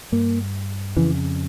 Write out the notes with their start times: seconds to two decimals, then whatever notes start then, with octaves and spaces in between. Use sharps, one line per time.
0.12 G2 A#3
0.96 F2 C#3 E3